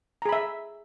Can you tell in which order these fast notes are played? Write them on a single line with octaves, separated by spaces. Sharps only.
A#5 G#4 B5 E5